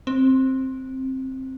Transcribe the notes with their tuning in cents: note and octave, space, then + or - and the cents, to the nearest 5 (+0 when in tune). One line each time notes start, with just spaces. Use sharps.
C4 +10